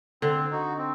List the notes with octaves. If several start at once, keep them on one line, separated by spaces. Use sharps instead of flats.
D3 C4
D#4 F#4
C4